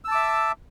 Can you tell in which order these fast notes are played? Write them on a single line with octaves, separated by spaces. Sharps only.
E6 A5 D6 E5